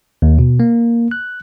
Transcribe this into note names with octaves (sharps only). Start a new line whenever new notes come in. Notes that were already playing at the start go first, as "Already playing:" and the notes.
D#2
B2
A#3
F#6